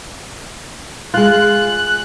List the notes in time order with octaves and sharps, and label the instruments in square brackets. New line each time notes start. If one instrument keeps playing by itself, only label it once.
[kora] G#3 F4 [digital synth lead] F#6